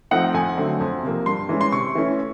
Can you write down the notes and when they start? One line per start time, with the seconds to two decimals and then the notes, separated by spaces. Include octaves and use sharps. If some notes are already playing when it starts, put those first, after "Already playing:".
0.11 F3 A3 C4 D#4 F#5
0.34 F2 G#5
0.57 D3 F#3 A3 C4
0.81 F2
1.03 C3 F3 A#3
1.26 G2 C6
1.49 E3 G#3 C#4
1.61 C6
1.73 C3 C#6
1.95 E3 A3 C#4 E4